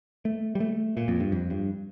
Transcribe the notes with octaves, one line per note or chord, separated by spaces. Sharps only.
A3
G3
A3
A#2
F2
G2
F2
G2